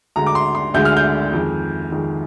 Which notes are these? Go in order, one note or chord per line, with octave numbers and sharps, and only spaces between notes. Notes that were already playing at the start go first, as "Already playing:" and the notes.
D2 D3 G#3 A#5
D6
C6
C6
D2 D3 G#3 G6
F6
G6
F2 D#3 G#3
F2 D#3 G#3